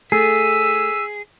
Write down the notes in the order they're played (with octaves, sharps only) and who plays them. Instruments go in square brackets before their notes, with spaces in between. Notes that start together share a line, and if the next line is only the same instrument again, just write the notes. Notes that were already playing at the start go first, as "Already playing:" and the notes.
[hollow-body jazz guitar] A3 [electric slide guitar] G#4 [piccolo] E6 [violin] B6 D#7